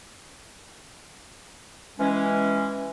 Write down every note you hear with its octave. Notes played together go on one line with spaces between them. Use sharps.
E3 G#3 C#4